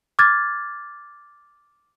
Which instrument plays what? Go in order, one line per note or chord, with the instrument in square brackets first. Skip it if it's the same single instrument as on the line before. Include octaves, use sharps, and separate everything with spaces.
[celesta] D6 F6 G#6 A6